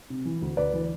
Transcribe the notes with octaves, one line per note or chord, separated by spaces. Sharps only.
C3
E3
D2
D2 B4 D5
E3